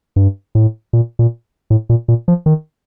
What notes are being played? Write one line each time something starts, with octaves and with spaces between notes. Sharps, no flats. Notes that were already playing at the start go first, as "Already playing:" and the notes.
G2
A2
A#2
A#2
A2
A#2
A#2
F3
D#3